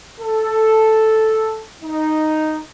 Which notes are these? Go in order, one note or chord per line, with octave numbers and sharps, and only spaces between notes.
A4
D#4